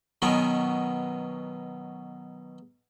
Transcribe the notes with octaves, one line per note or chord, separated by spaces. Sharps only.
B2 D#3 F#3 B3 C#4